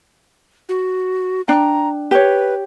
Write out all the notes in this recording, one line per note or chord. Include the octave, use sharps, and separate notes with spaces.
F#4
D4 G5 A#5
G4 B4 C#5